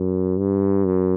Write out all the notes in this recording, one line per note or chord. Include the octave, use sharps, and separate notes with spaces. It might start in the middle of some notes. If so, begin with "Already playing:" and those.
Already playing: F#2
G2
F#2